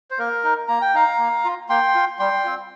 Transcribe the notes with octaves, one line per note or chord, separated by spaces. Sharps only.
C5
A#3 A#4
D#4
A#3 A#5
G5
D#4 F5 A#5
A#3
F4
A#3 G5 C6
F4
G3 G5 C6
C4 F4